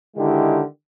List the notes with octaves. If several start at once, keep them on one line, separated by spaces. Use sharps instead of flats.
D3 D#3 G#3 E4 G4